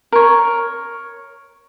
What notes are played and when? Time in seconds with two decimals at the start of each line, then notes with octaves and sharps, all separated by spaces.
0.12 A#4 C#5